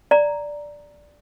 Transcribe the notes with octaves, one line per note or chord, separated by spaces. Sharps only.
D5 A#5